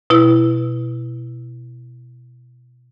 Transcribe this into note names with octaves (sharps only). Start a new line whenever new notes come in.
B2 E4 E6